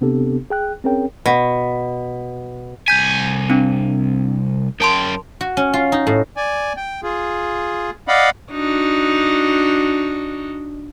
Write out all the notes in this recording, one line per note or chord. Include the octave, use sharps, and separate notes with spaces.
C3 B3 C4 D4 G4 A4
G#4 G5 F#6
C4 C#4 G#4 A#4 C#5 G5
B2
C2 G#5 G6 B6
C4 D4
F#2 A#4 G5 A5 C6
F#4
C#4
F4
D#4
A2
D5 G#5
G5
F4 G#4
D5 D#5 F5 F#5 B5
D4 D#4 F#4